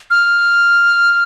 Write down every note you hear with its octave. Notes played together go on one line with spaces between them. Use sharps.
F6